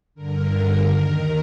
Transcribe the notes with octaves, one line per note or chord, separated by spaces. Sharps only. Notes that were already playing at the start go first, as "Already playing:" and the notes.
G2 D3 A#4
D#2 D#3